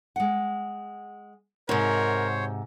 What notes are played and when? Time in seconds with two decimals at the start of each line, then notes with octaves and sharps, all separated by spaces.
0.16 G#3 F#5
1.69 G#2 C3 F#4 A#4 C5 C#5